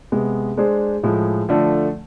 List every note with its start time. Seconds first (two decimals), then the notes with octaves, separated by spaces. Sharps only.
0.12 C3 G#3 B3
0.58 G#3 D4 G#4 C5
1.03 A2 F3 G#3
1.49 D3 F3 A3